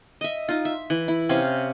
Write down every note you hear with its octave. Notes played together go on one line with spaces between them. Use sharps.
D#5 E5
D#4 F4
E5
E3
E4
C3 C#4 F5 C6